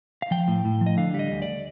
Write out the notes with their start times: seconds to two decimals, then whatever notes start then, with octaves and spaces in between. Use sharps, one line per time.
0.22 F5
0.31 F3 G5
0.48 A2
0.65 A2
0.81 F3
0.86 D#5
0.97 D3 F5
1.14 G3
1.19 D#5
1.31 D2
1.42 D5